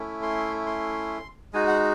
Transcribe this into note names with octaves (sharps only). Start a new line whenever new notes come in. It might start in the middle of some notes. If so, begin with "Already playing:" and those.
Already playing: A3 C#4 E4
C6
C6
G#3 D#4 F#4 G#5
F#5